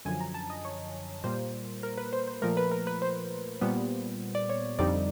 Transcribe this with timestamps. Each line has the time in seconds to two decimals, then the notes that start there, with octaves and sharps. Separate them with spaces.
0.05 F#2 D3 F3 G#5
0.21 A#5
0.34 A5
0.50 D#5
0.65 C#5
1.24 A#2 G3 A#3 C5
1.83 A#4
1.98 B4
2.13 C5
2.28 C5
2.42 A#2 F3 A3 A#4
2.57 B4
2.71 A#4
2.87 B4
3.02 C5
3.61 A#2 G3 B3
4.35 D5
4.49 C#5
4.79 F2 D3 G3 C4 D#4 D5